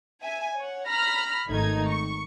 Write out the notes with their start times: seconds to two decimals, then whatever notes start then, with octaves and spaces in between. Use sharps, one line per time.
0.22 E5 G#5
0.58 C#5 F#5
0.89 A#5 B5 F6 A#6
1.47 G#1 D#3 A3 D#4 G#6
1.88 C#6